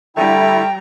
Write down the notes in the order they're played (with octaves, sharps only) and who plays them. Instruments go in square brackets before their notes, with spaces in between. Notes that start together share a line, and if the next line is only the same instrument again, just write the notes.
[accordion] D3 E4 [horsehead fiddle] G3 A#5 [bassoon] A3 [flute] G5